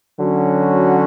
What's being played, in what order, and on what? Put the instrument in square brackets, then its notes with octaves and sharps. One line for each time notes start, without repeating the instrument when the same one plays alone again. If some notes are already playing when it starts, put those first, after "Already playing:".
[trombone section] D3 F#3 C#4 F#4